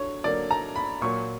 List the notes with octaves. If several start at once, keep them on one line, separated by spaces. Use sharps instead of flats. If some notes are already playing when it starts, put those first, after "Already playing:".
Already playing: D3 F#3 C#5
D3 F#3 A#3 D5
A#5
B5
A#2 F#3 A#3 C#6